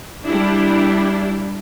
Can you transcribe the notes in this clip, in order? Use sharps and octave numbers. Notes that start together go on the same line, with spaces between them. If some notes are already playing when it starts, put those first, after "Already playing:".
G3 D4 E4